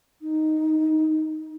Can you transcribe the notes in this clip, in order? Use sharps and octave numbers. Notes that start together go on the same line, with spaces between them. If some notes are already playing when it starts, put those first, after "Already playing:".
D#4